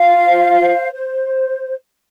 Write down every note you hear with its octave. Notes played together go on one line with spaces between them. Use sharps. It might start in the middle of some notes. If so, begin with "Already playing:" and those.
Already playing: F4 F5
C5
C5
C5